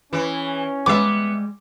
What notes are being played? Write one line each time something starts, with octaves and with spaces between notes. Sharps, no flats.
E3 C#4 G#4
G3 G#3 B3 E5 D6